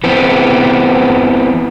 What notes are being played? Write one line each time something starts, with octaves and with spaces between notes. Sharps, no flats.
E3 B3 C4